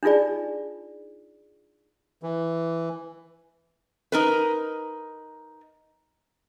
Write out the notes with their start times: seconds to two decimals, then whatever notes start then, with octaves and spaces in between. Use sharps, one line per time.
0.03 D4 D#4 F4 G#4 D5
2.23 E3
4.12 D#4 A#4 B4